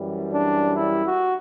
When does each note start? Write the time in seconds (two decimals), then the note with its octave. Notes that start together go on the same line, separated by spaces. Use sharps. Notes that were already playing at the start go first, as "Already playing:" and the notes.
Already playing: F#2 E3 G3
0.33 D4
0.75 E4
1.05 F#4